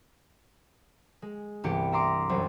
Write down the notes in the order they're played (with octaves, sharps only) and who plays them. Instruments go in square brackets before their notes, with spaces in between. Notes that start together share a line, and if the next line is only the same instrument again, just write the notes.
[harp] G#3
C2 G2 E3 B3 G4 C#7
E5 A#5 C6 D6
E1 F#2 F#3 G3 C5